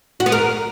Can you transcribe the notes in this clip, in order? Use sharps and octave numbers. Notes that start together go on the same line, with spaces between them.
F#4
B3
A#4